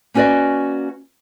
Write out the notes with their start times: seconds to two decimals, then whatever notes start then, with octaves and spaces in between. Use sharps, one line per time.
0.14 A#3 C#4 F#4 B4 D5 D#5